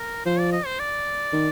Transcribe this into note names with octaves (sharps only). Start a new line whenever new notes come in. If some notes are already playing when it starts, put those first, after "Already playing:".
Already playing: A#4
F3 C5
D5
D#5
C5
D5
D#3